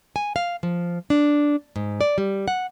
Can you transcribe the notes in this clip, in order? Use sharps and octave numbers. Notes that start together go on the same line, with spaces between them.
G#5
F5
F3
D4
G#2
D5
G3
F#5